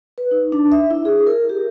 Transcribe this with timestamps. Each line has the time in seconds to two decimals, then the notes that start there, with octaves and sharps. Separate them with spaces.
0.18 B4
0.31 D#4
0.52 D4
0.72 E5
0.91 E4
1.05 G#4
1.27 A#4
1.49 G4